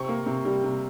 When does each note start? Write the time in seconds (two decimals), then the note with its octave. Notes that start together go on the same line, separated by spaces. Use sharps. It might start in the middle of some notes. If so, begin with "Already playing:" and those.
Already playing: C3 C4 C#6
0.09 A#3
0.26 C3
0.45 G3
0.64 C3